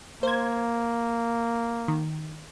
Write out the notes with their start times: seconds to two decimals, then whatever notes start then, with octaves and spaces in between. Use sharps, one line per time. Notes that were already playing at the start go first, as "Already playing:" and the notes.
0.23 A#3 C5 G#6
1.88 D#3